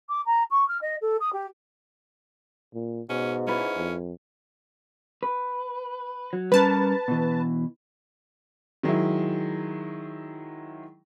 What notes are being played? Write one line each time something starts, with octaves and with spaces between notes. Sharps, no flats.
D6
A#5
C#6
F6
D#5
A4
D#6
G4
A#2
G#2 B2 C#4
C#4 E4 F4 B4
F2
B4
F#3
G3 C#4 A#4 B4 A5
B2 E3
D#3 F#3 G#3 E4